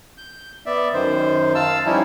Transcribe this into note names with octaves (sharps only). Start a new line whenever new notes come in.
G6
B3 D5 E5
F#2 D#3 C5
F5 A5 E6
F3 G3 C#4 D#4 E4